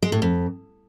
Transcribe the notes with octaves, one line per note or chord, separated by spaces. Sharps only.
G#3
A2
F2